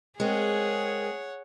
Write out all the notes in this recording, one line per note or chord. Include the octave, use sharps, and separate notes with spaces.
G#3 C4 G#4 A#4 C#5 F#5